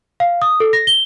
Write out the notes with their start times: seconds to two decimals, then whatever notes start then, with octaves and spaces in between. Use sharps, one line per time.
0.20 F5
0.42 D#6
0.60 A4
0.73 A#6
0.87 G7